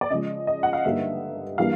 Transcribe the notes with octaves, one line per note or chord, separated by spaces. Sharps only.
D5
C#3 F3 G#3 D#5
D#5
F#5
F5
G2 D3 G3 A#3 D#4 E5
E3 G3 A#3 D4 F5